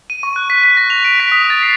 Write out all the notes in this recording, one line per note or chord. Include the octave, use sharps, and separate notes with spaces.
D#7
C#6
F#6
B6
B6
A#6
F7
D7
B6
D#6
A6
C7